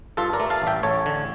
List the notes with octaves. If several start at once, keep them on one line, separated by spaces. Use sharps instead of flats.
G2 F4 A4
A#4 D5
A3
F5 A5
A1
E5 G5
A1 A4 C#5
D3